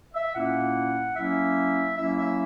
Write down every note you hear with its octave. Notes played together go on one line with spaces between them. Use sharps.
E5
A#2 A#3 C#4 E4 F#5
F#3 A#3 C#4 E4 E5
F#3 A#3 C#4 E4 E5
E5